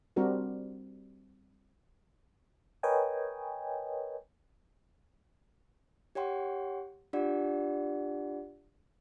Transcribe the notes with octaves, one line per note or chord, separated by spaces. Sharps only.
G3 C4 D4 F#4 A#4
A#4 B4 C#5 D#5 G5 G#5
G4 C#5 F#5 G5 C6
D4 F4 G4 D5 F#5